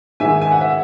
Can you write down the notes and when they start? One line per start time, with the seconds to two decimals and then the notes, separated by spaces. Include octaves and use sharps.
0.20 G#2 D#3 G#3 E5 G#5
0.41 G#5
0.51 F#5
0.61 E5